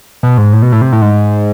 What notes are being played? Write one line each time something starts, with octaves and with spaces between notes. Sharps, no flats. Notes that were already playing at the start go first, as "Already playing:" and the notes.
B2
G#2
A2
B2
A2
C3
A2
G#2